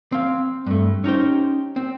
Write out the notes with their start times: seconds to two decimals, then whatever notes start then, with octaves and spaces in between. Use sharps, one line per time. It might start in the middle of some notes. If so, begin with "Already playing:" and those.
0.12 C4 F5
0.66 G2 A3
1.04 C#4 D#4 G4 C5
1.76 C4